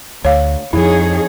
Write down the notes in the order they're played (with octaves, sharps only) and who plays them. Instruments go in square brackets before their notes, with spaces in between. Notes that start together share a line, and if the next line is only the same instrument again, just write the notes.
[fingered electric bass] D2 [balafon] C#5 F5
[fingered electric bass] F2 F3 [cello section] D#4 G#4 C#5 [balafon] E4